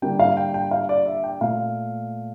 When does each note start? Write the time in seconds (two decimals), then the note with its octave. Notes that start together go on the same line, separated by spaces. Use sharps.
0.02 D3 G3 A#3 G5
0.19 F5
0.37 G5
0.54 G5
0.71 F5
0.89 D5
1.06 E5
1.24 G5
1.40 A#2 A3 F5